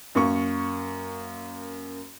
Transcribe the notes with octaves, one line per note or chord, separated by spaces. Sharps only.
F#2 A#3 C#6